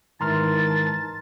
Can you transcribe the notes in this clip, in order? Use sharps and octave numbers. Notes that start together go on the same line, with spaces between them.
G#2 D#3 E3 E4 A5 A#5 C6 F6